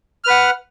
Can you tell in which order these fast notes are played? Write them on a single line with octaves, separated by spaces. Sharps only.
F6 B4 F#5